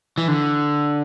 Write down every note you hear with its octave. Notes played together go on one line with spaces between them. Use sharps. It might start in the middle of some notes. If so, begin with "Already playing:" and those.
E3
D3